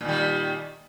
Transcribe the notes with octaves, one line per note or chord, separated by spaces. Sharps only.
A#2 D#3 G3